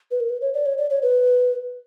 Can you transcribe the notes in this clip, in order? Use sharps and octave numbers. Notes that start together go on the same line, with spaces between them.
B4
A#4
B4
C#5
D5
C#5
D5
C#5
B4